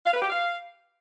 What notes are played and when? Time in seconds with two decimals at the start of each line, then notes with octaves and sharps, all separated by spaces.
0.05 F5
0.14 B4
0.22 G4
0.30 F5